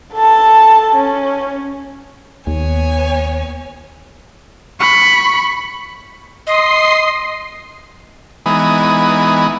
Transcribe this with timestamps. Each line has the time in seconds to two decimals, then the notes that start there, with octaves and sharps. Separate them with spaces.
0.14 A4 A5
0.96 C#4
2.47 D#2 B3 C#5 G#5
4.80 B5 C#6
6.47 D#5 C6 D#6 C7
8.46 E3 G#3 B3 D#4